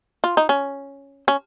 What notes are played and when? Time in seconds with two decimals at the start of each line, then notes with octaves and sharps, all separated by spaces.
0.24 F4
0.37 D#4
0.49 C#4
1.28 C#4